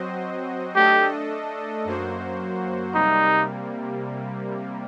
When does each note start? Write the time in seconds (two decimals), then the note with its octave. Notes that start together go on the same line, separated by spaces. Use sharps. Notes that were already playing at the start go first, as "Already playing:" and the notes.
Already playing: F#3 C4 F#4 C5 D#5
0.75 A3 D4 G4 A4 D#5
1.85 F#2 F#3 A#3 F#4 C5
2.94 C3 G3 A#3 D#4